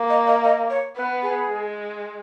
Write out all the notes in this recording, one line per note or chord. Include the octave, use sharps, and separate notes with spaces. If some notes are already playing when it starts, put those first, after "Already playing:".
Already playing: A#3
D#5
D#5
D#5
C#5
B3 B4
G#4
G#3